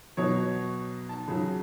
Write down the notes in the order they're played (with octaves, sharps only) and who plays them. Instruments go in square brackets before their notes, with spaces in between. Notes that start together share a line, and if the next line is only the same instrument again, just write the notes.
[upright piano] B2 F#3 C#5
A5
C#3 F#3